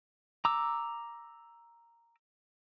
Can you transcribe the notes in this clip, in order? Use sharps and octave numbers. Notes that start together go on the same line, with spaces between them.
A#5 D6 E6